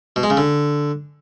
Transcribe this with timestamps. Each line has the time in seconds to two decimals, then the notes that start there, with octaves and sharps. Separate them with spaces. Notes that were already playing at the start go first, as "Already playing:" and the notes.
0.16 B2
0.23 G#3
0.30 C#3
0.37 D3